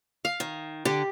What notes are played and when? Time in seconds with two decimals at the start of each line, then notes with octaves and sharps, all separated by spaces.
0.25 F5
0.40 D#3
0.85 D3 G4